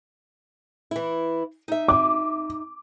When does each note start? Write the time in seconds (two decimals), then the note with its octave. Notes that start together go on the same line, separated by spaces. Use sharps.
0.91 E3 E4
1.68 D#4 E5
1.88 D6